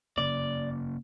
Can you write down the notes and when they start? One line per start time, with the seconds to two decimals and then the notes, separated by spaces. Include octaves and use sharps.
0.18 C#3 A#3 D5